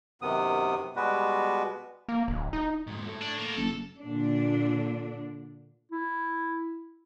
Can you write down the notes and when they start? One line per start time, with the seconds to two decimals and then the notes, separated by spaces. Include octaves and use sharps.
0.22 F#2 C3 D#3 B3 D#6
0.96 B2 G3 G#3 B3 F#4 B4
2.09 A#3
2.28 D1
2.53 D#4
2.87 G#2 B2
3.06 A3 E4
3.21 D4
3.39 A#3 B3
3.57 F#1 A4
3.99 A#2 D3 D4
5.92 E4